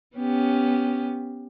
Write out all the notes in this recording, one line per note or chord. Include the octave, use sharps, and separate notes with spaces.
B3 C#4 G4